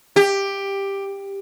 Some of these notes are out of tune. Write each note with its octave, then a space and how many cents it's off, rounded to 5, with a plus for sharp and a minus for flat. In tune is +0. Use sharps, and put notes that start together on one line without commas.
G4 +10